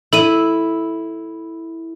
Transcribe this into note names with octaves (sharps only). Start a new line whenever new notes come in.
E4 A4 D#7